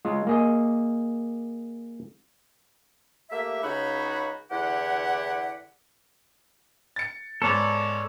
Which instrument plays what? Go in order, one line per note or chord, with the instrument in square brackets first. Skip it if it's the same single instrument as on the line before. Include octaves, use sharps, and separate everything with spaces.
[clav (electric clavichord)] G#3 F4
A#3 G#4 D#5
[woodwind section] A3 A#3 G4 E5
C#2 C#3 D#4 F#4 C#5 B5
E2 D3 E4 G4 F#5
[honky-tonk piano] A6 C#7
[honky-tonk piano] G#2 B3 [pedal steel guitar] A4 C#5 D5